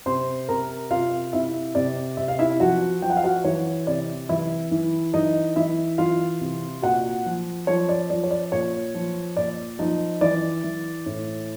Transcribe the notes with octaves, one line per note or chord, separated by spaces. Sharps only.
C3 C5 C6
C3 A#4 A#5
C3 F4 F5
C3 E4 E5
C3 D5
C3 E5
F5
E4 E5
F3 F#4 F#5
F3 G5
F#5
F5
F#4 F#5
E3 C#5
C3 D5
E3 E4 E5
E3
E3 D#4 D#5
E3 E4 E5
E3 F4 F5
C3
A#2 F#4 F#5
F3
F3 C#5
D5
F3 D5
C#5
D5
A#2 C#5
F3
A#2 D5
F3 D#4 D#5
E3 D5
E3
A2